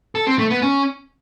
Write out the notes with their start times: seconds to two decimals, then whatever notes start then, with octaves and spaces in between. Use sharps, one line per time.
0.15 A4
0.27 C4
0.38 A3
0.50 B3
0.62 C#4